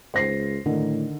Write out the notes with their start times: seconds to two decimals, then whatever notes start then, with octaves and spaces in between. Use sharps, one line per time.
0.14 C#2 C5 A#6 C7
0.66 A2 D3 D#3 D#4